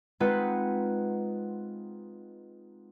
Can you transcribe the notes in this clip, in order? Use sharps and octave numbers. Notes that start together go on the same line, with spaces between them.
G#3 C4 D#4 F4 B4 F#5